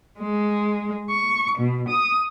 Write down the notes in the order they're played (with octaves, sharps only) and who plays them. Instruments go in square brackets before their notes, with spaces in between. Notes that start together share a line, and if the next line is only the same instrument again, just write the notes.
[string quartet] G#3
C#6
B2
D#6